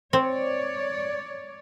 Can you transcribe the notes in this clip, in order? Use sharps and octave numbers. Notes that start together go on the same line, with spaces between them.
C4 C#5 D5